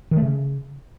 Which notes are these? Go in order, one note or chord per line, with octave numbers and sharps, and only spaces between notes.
D#3
A3
C#3